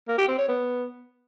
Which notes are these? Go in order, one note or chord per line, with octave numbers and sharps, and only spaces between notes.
A#3
G4
C4
C#5
B3